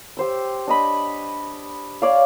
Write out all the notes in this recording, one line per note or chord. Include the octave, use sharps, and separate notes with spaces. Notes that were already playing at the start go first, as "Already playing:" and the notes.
G4 C5 E6
D4 D#5 B5
C#5 D5 F5